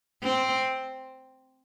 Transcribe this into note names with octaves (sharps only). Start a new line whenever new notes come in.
C4